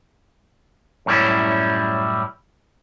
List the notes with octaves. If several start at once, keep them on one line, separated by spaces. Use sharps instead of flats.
F#2 A2 G3 C#4 E4